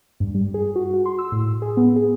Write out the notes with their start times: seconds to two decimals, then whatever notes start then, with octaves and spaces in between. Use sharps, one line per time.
0.20 G2
0.35 G3
0.54 G#4
0.76 F#4
0.94 F#4
1.06 C6
1.19 E6
1.32 A2
1.62 G#4
1.77 B3
1.96 G#4